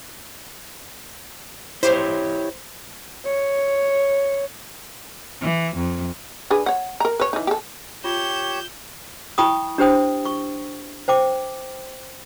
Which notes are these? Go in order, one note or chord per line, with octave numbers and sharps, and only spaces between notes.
E4 G4 C5 C#5
C#5
E3
F2
D4 G#4 B4
C#5 F#5
A#4 A#5
B4 C#5
E3 D#4
G4 A4
F4 G4 C#5 G6 E7
E4 G5 B5 C#6 D#6
D4 G4 C5 G5 D#6
C#6
C5 G5 D6